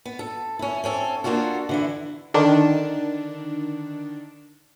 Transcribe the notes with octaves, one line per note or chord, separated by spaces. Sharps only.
B3
A4
C#4 E4
C4 C#4 A4
A#3 D4 F4 F#4 A4
D3 E3 E4
D3 D#3 D4